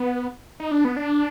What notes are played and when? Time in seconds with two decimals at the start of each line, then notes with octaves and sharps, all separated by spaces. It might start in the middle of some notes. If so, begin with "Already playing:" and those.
Already playing: B3
0.60 D#4
0.71 D4
0.85 B3
0.97 D4